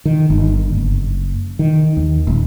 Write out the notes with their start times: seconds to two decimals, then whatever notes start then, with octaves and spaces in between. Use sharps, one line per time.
0.05 D#3
0.30 G1
0.75 F#1
1.59 D#3
1.97 D#2
2.27 D#1